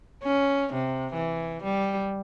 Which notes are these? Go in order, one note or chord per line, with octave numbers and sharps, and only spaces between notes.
C#4
C3
E3
G3